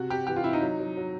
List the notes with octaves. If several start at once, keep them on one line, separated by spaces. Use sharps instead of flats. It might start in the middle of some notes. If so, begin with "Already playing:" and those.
Already playing: C3 F#4
C3 G4
E3 G4
F4
C3 E4
D#4
F#3
F#3
F#3